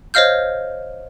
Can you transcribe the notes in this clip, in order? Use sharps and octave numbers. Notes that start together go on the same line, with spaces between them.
C5 C#5 D#5 F5 F6 G6